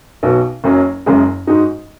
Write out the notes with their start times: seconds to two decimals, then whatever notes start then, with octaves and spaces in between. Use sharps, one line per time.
0.23 B1 B2 B3 F#4
0.64 F#1 F#2 F#3 C#4
1.06 F#1 F#2 C#3 G#3
1.47 G#2 G#3 D#4 F#4